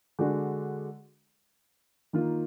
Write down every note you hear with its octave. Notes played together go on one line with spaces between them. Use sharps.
D3 G#3 D4 F#4
D#3 A#3 F4